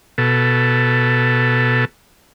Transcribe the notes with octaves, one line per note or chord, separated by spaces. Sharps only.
B2 A4